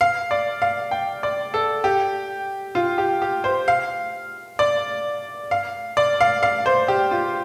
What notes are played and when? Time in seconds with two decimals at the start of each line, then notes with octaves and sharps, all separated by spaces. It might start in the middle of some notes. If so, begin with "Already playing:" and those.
0.01 F5
0.31 D5
0.62 F5
0.91 G5
1.23 D5
1.54 A4
1.84 G4
2.75 F4
2.98 G4
3.22 G4
3.44 C5
3.68 F5
4.59 D5
5.51 F5
5.97 D5
6.21 F5
6.43 F5
6.66 C5
6.88 G4
7.11 F4